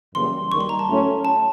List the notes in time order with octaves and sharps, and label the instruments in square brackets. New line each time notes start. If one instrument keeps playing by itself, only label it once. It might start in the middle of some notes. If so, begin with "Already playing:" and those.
[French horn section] F#2 C#3 E3 G3 A#3 [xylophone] C6
[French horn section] D#2 D#3 G3 [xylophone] C#6
[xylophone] C6
A#5
A5
[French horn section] A2 F#3 A3 C#4 E4
[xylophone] A5